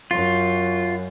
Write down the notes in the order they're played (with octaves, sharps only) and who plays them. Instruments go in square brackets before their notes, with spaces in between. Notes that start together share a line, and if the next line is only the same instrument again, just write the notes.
[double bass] F#2 [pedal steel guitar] F4